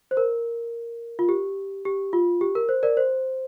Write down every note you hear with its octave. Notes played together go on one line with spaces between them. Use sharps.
C5
A#4
F4
G4
G4
F4
G4
A#4
C5
A#4 D5
C5